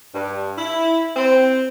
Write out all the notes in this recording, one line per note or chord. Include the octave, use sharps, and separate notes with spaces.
G2
E4
C4